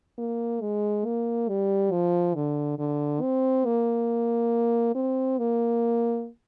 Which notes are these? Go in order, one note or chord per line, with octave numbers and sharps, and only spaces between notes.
A#3
G#3
A#3
G3
F3
D3
D3
C4
A#3
C4
A#3